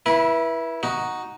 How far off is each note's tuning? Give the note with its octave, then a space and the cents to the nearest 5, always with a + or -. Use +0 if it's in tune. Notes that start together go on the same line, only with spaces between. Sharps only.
E4 +0 B4 -30
D#4 +0 F#4 +0